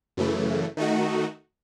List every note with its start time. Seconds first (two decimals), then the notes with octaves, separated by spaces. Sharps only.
0.17 F#2 C#3 E3 A3
0.77 D#3 A3 D#4 F#4